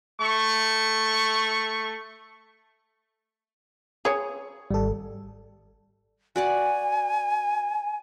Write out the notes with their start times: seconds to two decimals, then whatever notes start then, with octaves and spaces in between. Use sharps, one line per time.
0.20 A3 C#6
4.05 G#4 C#5
4.71 G#1 G3 A4
6.36 F#4 D5 F#5 G#5